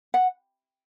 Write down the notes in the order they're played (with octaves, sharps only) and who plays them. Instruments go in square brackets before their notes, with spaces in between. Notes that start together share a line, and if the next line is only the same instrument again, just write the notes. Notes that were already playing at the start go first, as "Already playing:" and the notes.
[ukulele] F#5